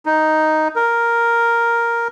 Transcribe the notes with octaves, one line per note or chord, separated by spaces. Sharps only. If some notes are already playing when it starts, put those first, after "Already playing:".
D#4
A#4